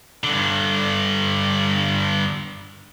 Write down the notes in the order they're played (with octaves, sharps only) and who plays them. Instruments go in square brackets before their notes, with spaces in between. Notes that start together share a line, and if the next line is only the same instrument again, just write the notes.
[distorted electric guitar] G2 D3